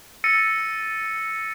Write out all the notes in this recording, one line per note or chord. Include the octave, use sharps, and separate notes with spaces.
E6 A6 A#6 C#7 D#7